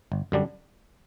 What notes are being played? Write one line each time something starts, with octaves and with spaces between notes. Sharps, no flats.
G1
F#2 D3 G3 D4